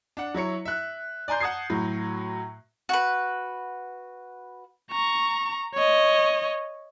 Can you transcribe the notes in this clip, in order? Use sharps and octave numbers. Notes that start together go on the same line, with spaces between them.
D4 F#5
F#3 E4 C#5 C#7
E5 F#6
D5 G#5 A#5 C6 G6
F#5 A5 D#6 G#6 C7
A2 F#3
F#4 B4
A#5 C#6
C#5 D#5